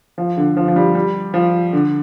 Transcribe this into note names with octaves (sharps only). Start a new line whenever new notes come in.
F3
D3
F3
F3
G3
G3
F3
D3